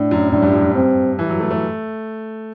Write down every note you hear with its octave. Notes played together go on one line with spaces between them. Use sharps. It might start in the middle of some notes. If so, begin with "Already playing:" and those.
Already playing: A2 D4
F#2
A2 D4
G2
F#2
G2
C4
E3
F#3
A3
A3